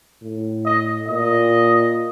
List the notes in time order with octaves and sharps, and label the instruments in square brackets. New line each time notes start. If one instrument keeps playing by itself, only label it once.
[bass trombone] A2
[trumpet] D#5
[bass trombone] A#2 [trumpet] D#5